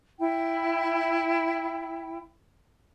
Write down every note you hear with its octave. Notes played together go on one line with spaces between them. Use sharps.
E4 G5